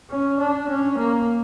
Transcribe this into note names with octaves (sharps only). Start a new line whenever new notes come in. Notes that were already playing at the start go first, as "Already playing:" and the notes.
C#4
D4
C#4
A#3